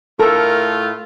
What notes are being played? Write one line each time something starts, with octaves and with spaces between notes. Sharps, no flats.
A2 A3 F4 A4 A#4